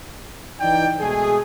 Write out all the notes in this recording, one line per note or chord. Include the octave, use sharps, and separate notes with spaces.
E3 D#4 D5 G5
B2 G#3 A3 G#4